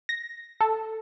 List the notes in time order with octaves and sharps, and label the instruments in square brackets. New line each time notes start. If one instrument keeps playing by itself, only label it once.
[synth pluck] A#6
A4